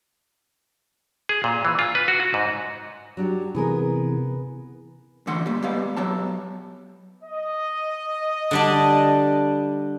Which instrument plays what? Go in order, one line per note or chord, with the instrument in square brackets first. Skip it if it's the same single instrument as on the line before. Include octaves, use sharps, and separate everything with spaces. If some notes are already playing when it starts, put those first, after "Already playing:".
[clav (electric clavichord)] G#4
A#2
E3
F4
B4
F#4
F#4
G#2
[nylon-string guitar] F#3 D4 G4
[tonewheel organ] C3 E3 [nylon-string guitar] B3 G#4 A#4
[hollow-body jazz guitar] D3 E3 A3 F#5 C6
G3 A#3
G3 G#3 B3 F5
F#3 B3 G4 A5
[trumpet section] D#5
[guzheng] D3 G3 D4